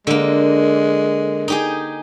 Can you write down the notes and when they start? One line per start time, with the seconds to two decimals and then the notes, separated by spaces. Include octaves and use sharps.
0.07 D3 G#3 A#3
1.48 D#4 G4 G#4